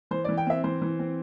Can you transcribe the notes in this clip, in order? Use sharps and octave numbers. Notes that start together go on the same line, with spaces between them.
E3 C5
E3 D5
G5
C4 E5
E3 C5
E3
C4